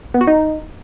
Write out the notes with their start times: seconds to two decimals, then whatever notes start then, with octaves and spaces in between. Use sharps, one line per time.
0.14 B3
0.21 F#4
0.27 D#4